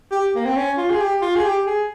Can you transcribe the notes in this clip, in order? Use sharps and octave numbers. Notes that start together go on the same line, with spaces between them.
G4
A#3
C4
C#4
F4
G#4
G4
F4
G#4
G4
G#4